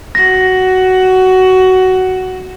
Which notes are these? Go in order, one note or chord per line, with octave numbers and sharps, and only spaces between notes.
F#4 A#6